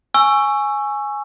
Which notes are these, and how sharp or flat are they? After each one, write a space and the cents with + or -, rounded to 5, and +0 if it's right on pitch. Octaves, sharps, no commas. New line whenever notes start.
G#5 +0 C#6 +0 E6 +15